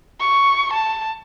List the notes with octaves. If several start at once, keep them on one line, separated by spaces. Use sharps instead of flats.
C#6
A5